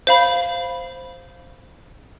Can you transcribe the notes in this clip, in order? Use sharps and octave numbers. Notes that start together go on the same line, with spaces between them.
C5 F5 B5